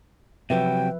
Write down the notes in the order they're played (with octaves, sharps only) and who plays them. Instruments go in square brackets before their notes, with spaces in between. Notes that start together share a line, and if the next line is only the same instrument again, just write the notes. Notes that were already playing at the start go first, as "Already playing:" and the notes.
[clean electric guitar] C3 F#3 [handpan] F3 B4 E5 [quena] G5